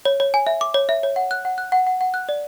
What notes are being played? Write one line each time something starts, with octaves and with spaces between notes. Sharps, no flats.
C#5
C#5
G#5
E5
D6
C#5
E5
C#5
F#5
F#6
F#5
F#6
F#5
F#5
F#5
F#6
D5